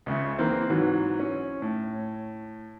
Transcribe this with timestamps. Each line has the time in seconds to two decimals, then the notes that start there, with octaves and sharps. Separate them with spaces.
0.06 C#2 C#3 E5
0.39 E3 A#3 C4
0.70 G#2 E3 F#3
1.20 C#4
1.62 A2